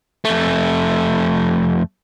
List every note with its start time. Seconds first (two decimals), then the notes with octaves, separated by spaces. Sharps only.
0.25 F2 A3